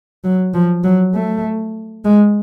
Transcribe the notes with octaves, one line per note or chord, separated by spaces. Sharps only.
F#3
F3
F#3
A3
G#3